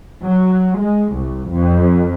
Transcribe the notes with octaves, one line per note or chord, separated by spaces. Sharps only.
F#3
G#3
C2
F2